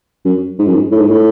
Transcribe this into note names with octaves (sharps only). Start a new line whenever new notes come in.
F#2
G#2
F#2
G#2
A2
G#2
A2